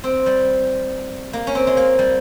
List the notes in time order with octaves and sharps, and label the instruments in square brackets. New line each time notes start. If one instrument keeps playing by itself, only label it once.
[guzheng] C4
G3
A#3
C#4
C4
G#3
A#3
G3